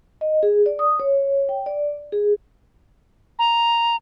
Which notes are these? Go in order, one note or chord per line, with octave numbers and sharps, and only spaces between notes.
D#5
G#4
D5
D#6
C#5
G5
D5
G#4
A#5